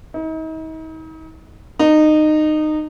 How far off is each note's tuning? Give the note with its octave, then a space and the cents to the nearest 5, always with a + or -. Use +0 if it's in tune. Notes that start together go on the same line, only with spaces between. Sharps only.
D#4 +40
D#4 -20